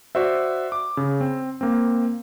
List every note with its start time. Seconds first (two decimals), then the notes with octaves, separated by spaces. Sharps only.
0.15 F#4 C5 D5 E5
0.72 D6
0.97 C#3
1.21 C4
1.61 A#3 C4